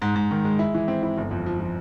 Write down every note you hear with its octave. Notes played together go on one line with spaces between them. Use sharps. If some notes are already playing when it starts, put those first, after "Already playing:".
G#2
G#2
D#3
G#3
E4
E3
C4
E4
G1
F2
F3
F3